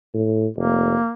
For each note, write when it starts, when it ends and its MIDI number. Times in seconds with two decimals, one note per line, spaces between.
0.14 0.47 45
0.57 0.95 29
0.57 1.11 58